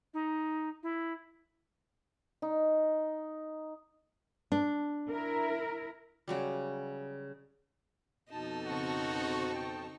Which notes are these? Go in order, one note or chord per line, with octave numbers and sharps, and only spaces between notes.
D#4
E4
D#4
D4
E4 A#4
C#3 F#3 G3
F2 B2 D#4 A5
C#3 C4 F#4 C#6
G5